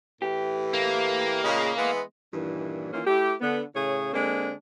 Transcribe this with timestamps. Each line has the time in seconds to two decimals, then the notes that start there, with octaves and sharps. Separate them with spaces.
0.22 A2 E3 G4
0.73 A#3
1.43 A#2 C#3 G#3
1.77 E3 G#3 B3
2.33 G2 A#2 D#3 E3
2.93 D#3 E3 A#3 C#4 F4
3.07 A3 E4 G4
3.41 D3 B3
3.75 A2 C#3 G#4 C#5
4.13 D3 G#3 A#3 C4 D4